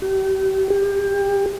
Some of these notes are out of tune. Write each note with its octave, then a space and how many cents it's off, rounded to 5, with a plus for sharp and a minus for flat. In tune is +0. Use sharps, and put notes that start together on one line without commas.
G4 -35
G4 +25